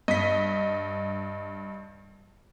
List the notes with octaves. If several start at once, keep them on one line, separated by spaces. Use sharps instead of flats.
G2 D#5 B6